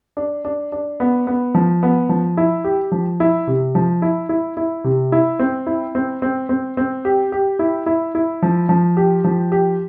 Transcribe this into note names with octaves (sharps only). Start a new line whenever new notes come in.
D4
D4
D4
B3
B3
F3
B3
F3
E4
G4
F3
E4
C3
F3
E4
E4
E4
C3
E4
C4
E4
C4
C4
C4
C4
G4
G4
E4
E4
E4
F3
F3
G4
F3
G4